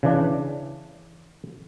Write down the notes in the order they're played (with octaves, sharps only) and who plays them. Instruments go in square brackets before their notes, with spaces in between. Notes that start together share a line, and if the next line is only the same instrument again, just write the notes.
[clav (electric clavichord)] C#3 E3 D4